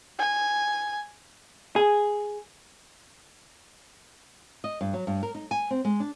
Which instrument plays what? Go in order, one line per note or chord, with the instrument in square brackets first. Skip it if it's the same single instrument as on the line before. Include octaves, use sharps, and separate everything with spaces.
[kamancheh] G#5
[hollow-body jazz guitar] G#4
[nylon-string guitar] D#5
G2
F#3
G2
A#4
D#4
G#5
C4
G#3
D4